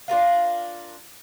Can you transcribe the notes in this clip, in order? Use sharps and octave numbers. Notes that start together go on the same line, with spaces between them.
D4 F4 A#4 F5